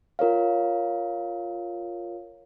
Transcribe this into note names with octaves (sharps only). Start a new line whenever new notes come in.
F4 A#4 C#5 F5